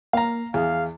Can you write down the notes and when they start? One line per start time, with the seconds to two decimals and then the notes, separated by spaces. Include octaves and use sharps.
0.13 A#3 F5 A#5
0.54 E2 G#4 F5